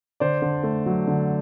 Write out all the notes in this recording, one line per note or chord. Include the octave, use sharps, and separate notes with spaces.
D3 C5 D5
D3
A3
F#3
D3